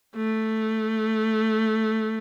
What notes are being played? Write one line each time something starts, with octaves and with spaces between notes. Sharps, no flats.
A3